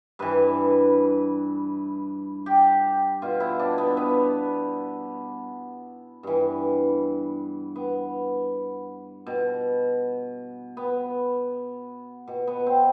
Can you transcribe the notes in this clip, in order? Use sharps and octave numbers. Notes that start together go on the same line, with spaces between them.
G2 E3 B4
G4
B2 F4
E4
D4
B3
B3
G2 E3
B3
B2
B3
B2
B3
C4